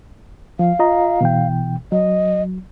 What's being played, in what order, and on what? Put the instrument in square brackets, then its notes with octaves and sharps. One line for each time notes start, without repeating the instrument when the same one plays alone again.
[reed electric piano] F3 [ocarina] F5
[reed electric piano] F4 D#5 A#5
B2 E3 G5
[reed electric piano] F#3 [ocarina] D#5